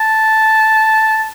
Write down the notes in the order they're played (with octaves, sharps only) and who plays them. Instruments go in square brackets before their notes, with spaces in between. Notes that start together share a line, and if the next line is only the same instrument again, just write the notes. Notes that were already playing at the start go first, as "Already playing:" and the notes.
Already playing: [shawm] A5